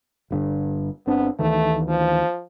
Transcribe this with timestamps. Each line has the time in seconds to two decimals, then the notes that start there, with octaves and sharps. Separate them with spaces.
0.30 G1 G2 D3
1.07 G1 B3 C4 D4
1.39 D2 D#3 E3 A3
1.88 F3